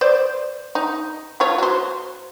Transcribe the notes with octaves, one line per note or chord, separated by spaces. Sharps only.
C5 D5
D#4
A3 F4 C#5
F#4 C5